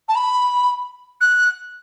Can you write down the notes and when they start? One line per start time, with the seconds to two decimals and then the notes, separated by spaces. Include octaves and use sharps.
0.08 A5
0.15 B5
1.20 F#6